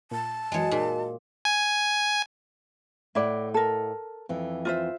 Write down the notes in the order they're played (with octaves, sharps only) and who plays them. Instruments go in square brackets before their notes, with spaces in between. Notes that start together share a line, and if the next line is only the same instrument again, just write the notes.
[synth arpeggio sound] A#2 [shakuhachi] A5
[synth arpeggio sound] F#2 E3 [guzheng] G#3 C#5 [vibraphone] F#4 D#5
[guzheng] A#2 [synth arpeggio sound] D#4 G#4
[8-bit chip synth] G#5
[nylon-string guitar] A2 D#5 F#5 [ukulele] E4 D5
[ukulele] A4 A#4
[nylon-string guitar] F2 E3
[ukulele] F4 C5 E5